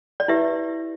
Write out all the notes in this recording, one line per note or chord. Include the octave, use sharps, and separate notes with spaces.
D5
E4 G4 B4 E5